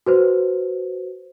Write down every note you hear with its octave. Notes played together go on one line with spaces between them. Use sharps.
F#4 B4 C5